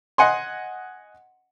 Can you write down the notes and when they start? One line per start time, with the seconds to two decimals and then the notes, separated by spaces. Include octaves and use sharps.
0.18 D#5 F#5 G#5 C6